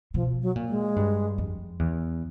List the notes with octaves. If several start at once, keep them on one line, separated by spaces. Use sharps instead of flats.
B2 F3
F#3
A#2
G#3
G2
F2
E2